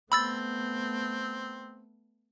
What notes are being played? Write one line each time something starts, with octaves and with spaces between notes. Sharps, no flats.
A3 B3 C4 B5 E6 A6